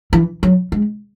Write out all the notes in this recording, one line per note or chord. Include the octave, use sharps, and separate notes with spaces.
E3
F#3
G#3